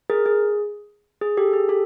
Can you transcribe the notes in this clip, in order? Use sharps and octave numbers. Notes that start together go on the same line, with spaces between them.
G#4 A#4
G#4
G#4
G4 A4
G#4
G4 A4